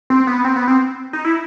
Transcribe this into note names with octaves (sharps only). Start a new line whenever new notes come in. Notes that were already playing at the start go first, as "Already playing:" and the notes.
C4
B3
C4
B3
C4
D#4
E4